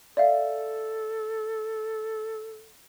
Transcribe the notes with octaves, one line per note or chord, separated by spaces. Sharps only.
A4 D5 E5 F5